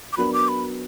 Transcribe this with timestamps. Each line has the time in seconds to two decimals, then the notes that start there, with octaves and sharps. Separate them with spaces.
0.13 D6
0.17 F#3 B3 D4 F#4 A#4 B5
0.33 D6
0.49 B5